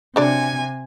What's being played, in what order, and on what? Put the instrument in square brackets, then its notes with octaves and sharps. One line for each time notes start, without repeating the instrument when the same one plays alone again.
[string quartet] C3 G#5 [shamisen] F#3 D4 D5